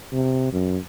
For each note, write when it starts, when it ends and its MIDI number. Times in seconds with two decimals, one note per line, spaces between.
0.12 0.50 48
0.52 0.78 42